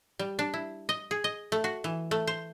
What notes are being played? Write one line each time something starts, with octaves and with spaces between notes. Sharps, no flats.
G3
D4
E4
D#5
G#4
D#5
A3
F#4
E3
A3
C5